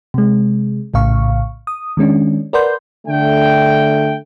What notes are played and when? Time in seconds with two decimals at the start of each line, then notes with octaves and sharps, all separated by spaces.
0.14 C3 G#3
0.94 A#1 A2 C#3 F5 C#6
1.67 D#6
1.97 D#3 G#3 C#4 D4
2.53 A#4 B4 D5 F#5 C6 G6
3.08 D3 A3 G5